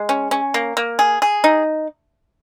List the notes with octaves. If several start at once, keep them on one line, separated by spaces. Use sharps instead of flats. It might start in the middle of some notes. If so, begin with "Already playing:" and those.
Already playing: G#3
C#4
C#4
A#3
A#3
G#4
G#4
D#4